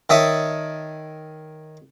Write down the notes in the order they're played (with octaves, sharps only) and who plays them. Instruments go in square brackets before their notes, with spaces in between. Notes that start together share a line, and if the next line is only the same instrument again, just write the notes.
[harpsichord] D#3 C#5 E5 A5 D#6